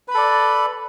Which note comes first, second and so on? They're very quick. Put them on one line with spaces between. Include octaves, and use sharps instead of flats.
B4 B5 A4 D5